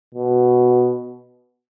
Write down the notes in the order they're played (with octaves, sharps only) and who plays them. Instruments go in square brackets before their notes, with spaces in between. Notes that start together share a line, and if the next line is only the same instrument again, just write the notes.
[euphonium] B2